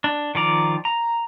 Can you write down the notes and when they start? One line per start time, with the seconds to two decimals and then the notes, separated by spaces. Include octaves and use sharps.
0.04 D4
0.35 D#3 F3 D5 A#5
0.85 A#5